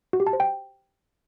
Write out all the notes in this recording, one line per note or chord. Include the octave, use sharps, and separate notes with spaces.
F#4
G4
A5
C5
G5